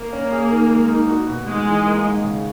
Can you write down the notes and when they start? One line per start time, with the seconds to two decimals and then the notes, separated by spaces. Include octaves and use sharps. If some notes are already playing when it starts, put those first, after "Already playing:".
Already playing: A#3
0.13 C#4
0.32 G#4
0.51 D#3
0.69 G#3
0.88 D#4
1.08 F#4
1.27 B2
1.46 G#2 G#3
1.66 E3
1.85 A#3
2.04 G#1
2.24 C#3